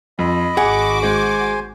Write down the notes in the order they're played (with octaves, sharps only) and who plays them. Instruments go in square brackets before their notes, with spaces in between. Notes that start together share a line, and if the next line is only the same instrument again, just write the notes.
[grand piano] F2 [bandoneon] D#5 B5
[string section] G#1 F#4 D6 [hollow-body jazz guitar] G#4 [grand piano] F#5
[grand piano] G#3 [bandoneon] C5 G#5